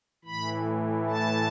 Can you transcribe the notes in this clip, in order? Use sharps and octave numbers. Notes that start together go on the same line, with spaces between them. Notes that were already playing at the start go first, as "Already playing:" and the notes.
A2 E3 B5
A5